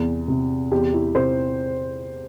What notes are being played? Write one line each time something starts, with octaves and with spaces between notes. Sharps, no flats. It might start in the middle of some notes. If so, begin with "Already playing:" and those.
Already playing: E2 C3
C3
E2 G4
E4
C3 C5